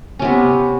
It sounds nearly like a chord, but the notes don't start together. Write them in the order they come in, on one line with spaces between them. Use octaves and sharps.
C#4 C3 B3